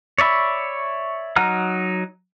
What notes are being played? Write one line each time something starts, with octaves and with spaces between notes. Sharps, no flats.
C#5 D5 E5 B5 C#6
F#3 D#4 F#5 A#5 F6